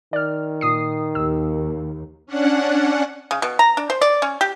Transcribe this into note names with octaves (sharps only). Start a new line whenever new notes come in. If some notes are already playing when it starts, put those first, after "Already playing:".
D#3 D5 F6
A#2 D#6 C7
D#2 E6
C#4 D4 F#5
C#3
B2
A#5
D4
C5
D5
C#4
G4